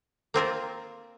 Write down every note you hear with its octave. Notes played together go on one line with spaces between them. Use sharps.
A#3 C4 F4 A#4